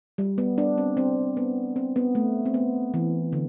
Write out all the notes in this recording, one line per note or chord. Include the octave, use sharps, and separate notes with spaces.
G3
B3
D4
C4
C4
B3
C4
B3
A3
C4
B3
E3
D3